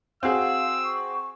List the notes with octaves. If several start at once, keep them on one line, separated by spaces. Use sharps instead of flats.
C4 F#4 G#4 F5 E6
C#6